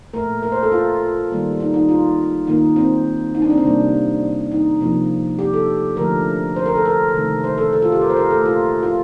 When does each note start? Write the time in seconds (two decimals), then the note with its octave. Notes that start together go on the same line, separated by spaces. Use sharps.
0.14 A#2 A3 A#4
0.43 A#4
0.52 C5
0.63 A4
0.72 F4
1.30 D#3 G3 A#3
1.60 D#4
1.74 D#4
1.89 F4
2.47 D#3 A#3 D#4
2.76 C4
3.35 D#4
3.42 D4
3.50 C4
3.58 D4
3.64 C3 G3 A#3
4.51 D#4
4.81 C3 F3 A#3
5.39 G4
5.54 A4
5.97 D3 F3 A3 A#4
6.56 C5
6.66 A#4
6.75 A4
6.86 A#4
7.14 C3 D#3 A3
7.44 C5
7.58 A4
7.73 A4
7.82 F4
7.92 G4
8.02 A#4
8.10 C5
8.16 A#4
8.31 A#2 A3 A4
8.45 F4
8.83 F4